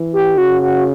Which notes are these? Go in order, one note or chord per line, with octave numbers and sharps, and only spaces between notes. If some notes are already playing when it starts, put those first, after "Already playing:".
Already playing: E3
G4
C#3 F#4
F#4